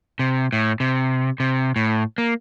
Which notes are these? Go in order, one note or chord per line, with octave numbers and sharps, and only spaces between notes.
C3
A2
C3
C3
A2
A#3